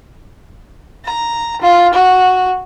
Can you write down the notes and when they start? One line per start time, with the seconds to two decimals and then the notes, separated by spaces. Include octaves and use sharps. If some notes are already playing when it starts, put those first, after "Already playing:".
1.05 A#5
1.62 F4
1.93 F#4